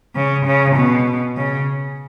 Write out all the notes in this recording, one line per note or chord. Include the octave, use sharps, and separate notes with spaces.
C#3
C#3
B2
C#3